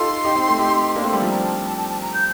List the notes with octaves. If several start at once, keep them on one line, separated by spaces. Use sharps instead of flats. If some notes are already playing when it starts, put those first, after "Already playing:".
Already playing: D#4 F4 G4 A4 C6
D#4 G4
C4 D#4
A3 C4
D#4 G4
A#3 D4
A3 C4
G3 A#3
F3
A#5
A5
A5
A5
A5
A#5
G6